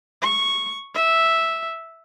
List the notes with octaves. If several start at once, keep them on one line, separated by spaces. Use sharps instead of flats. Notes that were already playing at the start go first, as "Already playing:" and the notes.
C#6
E5